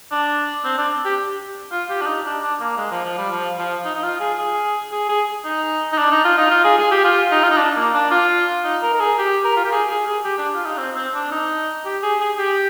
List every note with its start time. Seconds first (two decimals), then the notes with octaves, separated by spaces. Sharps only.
0.11 D4
0.64 C4
0.78 D4
1.05 G4
1.71 F4
1.90 G4
2.01 D4
2.06 D#4
2.25 D4
2.43 D4
2.61 A#3
2.78 G#3
2.91 F3
3.05 F3
3.18 G3
3.31 F3
3.58 F3
3.85 D#4
3.95 D#4
4.03 F4
4.20 G#4
4.38 G#4
4.92 G#4
5.09 G#4
5.45 D#4
5.92 D#4
5.98 D4
6.12 D#4
6.25 F4
6.38 D#4
6.51 F4
6.64 G#4
6.79 G#4
6.91 G4
7.04 F4
7.31 D#4
7.43 F4
7.51 D#4
7.58 D4
7.76 A#3
7.94 D4
8.11 F4
8.64 D#4
8.82 A#4
8.94 A#4
9.00 G#4
9.19 G4
9.44 A#4
9.56 F4
9.65 G4
9.72 G#4
9.90 G#4
10.07 G#4
10.25 G4
10.38 D4
10.55 F4
10.65 D#4
10.78 C4
10.96 C4
11.14 D4
11.32 D#4
11.85 G4
12.03 G#4
12.20 G#4
12.39 G4